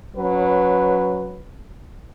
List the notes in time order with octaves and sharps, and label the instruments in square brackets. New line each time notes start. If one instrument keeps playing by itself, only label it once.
[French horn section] F#3 C#4 B4